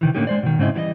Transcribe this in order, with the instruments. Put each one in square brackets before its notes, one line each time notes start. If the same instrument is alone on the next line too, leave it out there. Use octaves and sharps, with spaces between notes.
[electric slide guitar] C3 D#3 E3
A2 D3 A#3 C#4 D#4 G4
G#3 C5 D5
B2 D#3
G#2 C#3 C4 E4 D#5
E3 G3 D4 D#5